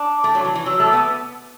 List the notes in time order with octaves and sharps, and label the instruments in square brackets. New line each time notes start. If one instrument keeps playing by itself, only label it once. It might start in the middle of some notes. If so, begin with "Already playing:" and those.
Already playing: [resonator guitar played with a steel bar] D4 [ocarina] D6
[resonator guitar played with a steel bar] A3
F#3
E3
E3
[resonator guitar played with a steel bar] F#3 [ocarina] E6
[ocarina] E6
[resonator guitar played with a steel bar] A3
[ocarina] D6
[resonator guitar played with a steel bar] B3 [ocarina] E6